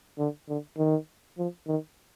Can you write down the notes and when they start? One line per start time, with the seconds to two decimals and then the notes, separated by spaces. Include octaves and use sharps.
0.19 D3
0.49 D3
0.78 D#3
1.38 F3
1.67 D#3